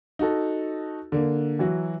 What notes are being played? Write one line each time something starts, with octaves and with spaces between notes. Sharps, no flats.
D#4 F#4 A4
D3 A#3
E3 F#3 F#4